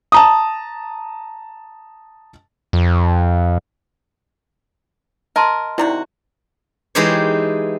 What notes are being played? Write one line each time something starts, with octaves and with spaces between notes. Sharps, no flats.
A5 A#5 D#6
F2
A#4 D#5 A5 C6
C3 D#3 E4 F#4 D5
E3 G#3 D#4 G4 C5 C#5